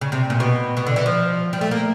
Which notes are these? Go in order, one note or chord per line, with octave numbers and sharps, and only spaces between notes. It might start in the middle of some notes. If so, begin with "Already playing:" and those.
C#3
C3
A#2
B2
B2
D3
E3
F3
G3
A3
A#3